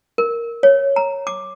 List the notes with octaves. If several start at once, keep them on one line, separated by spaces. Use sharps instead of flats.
A#4
C#5
A#5
D6